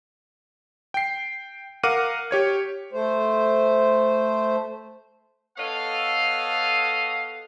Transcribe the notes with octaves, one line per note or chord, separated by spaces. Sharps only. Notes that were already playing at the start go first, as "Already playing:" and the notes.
G5 C7
A#4 F5 F#5 D6 F6 D#7
G4 C#5 G#6
A3 C5
B3 A4 C#5 D#5 F5